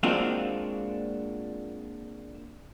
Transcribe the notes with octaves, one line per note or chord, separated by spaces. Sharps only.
G#3 A#3 C4 D4 F4 F#4